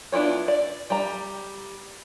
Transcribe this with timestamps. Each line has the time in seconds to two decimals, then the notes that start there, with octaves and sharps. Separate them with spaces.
0.12 B3 D4 E4 F4 C#5
0.48 D5
0.90 G3 A#5